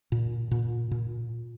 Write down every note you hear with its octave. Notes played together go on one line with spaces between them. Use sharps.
A#2
A#2
A#2